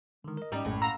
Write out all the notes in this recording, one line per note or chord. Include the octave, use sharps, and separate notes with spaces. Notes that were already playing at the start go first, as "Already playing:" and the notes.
D3 D#3 G#3
A#4 D#5
G#2 G3 C#4 D#4
A#1 F#2 A2 G#3
F5 F#5 A#5 E6